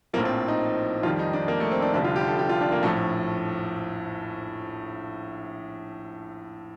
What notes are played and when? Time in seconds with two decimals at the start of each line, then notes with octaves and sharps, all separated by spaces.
0.13 A#1 A2 F3 A#3
0.25 C4
0.48 D#4
1.03 F2 D#3 G3 F4
1.19 D#4
1.33 D4
1.48 A#3
1.60 A3
1.72 C4
1.82 D4
1.94 F1 F2 D3 G3 D4
2.04 F4
2.16 G4
2.27 A4
2.39 G4
2.49 F4
2.61 D4
2.72 A#3
2.83 A#1 A2 F3 A3